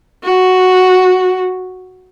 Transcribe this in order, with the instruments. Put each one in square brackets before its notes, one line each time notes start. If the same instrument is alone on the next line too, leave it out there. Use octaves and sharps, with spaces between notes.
[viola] F#4